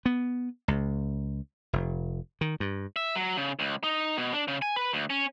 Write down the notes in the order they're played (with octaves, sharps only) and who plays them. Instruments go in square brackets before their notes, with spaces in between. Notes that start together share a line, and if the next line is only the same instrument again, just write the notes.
[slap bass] B3
C#2
F1
D#3
G2
[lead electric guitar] E5
F#3
C#3
C#2
D#4
B2
D4
C#3
G#5
B4
D2
C#4